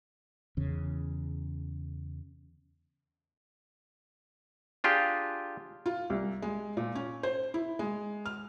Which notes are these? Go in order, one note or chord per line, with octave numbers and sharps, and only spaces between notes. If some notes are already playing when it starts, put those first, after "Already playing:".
E2 C#3
D4 F4 G4 G#4
F4
C2
G#3
A#2
C#4
C5
E4
G#3
F6